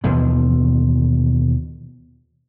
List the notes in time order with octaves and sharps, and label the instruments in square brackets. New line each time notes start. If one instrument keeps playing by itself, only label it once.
[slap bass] D#2 B2 E3 F3